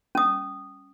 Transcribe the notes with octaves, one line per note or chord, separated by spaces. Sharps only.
C#4 D#6